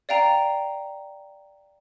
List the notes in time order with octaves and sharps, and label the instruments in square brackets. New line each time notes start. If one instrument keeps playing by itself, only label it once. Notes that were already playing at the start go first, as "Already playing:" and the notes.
[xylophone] D5 F5 G5 A#5